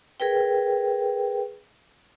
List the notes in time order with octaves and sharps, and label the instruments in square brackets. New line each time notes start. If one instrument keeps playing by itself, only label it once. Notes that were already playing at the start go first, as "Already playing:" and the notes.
[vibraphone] G#4 A#4 B4 G5